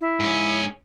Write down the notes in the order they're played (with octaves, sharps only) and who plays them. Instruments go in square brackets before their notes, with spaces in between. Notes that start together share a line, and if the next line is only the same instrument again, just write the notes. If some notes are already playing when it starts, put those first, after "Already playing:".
[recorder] E4
[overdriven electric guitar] G#2 C#4